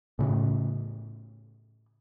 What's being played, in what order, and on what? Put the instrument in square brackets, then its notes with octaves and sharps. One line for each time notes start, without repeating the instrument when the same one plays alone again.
[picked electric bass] A2 C#3